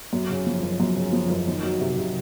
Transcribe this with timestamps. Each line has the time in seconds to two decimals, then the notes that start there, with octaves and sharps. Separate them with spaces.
0.13 F#2
0.30 C#3
0.47 F3
0.63 F#1
0.80 F#2
0.96 C#3
1.13 F3
1.30 F#1
1.47 D#3
1.63 F#3
1.80 C3
1.97 C3